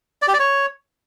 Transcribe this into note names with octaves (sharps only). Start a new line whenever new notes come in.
D5
G4
D5
C#5